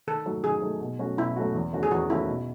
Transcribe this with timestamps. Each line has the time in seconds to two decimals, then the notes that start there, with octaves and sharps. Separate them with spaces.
0.07 D#3 A4
0.26 F#3 A3 D#4
0.44 D#3 G#4
0.62 F#3 A3 D#4
0.81 B2
0.99 F#3 A3 C#4 F#4
1.18 B2 E4
1.36 F#3 A3 C#4 F#4
1.55 E2
1.73 D#3 A3 C#4 F#4
1.83 G#4
1.91 E2 F#4
2.09 D#3 A3 C#4 E4 F#4
2.28 B2